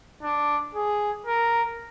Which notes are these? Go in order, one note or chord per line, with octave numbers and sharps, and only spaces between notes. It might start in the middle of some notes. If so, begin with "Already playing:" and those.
D4
G#4
A#4